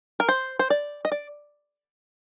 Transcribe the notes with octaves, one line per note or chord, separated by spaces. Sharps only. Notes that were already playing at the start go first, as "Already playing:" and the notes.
A#4
C5
C5
D5
D#5
D5